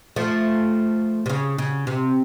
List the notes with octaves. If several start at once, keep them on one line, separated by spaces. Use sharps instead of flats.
F3 A3
C3
C#3
C#3
C3